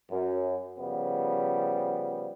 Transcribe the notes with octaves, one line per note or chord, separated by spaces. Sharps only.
F#2
C#3 F3 G3 B3